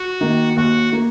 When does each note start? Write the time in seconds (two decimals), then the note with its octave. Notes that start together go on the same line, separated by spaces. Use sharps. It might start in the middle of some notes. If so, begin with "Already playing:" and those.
Already playing: F#4
0.21 D#3 A#3
0.57 D#2 F#4
0.93 A#3